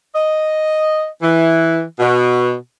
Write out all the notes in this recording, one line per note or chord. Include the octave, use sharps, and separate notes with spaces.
D#5
E3
B2